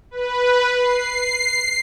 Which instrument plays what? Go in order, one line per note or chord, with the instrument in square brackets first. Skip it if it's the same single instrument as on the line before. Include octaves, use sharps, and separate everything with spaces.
[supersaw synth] B4
C7